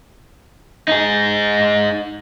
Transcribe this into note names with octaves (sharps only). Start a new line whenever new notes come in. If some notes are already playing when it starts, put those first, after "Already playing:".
D#4 G#4